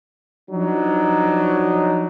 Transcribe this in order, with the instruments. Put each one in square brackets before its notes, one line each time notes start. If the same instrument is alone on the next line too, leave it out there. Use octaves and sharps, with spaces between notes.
[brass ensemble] F3 F#3 D4 D#4